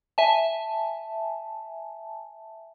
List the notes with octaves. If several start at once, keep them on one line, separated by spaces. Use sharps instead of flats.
E5 G#5 A5